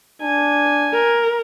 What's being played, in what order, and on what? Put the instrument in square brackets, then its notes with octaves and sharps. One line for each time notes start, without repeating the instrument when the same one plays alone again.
[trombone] D4 [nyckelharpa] G#5
[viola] A#4